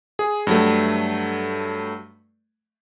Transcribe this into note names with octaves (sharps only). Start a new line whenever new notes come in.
G#4
G2 F#3 A3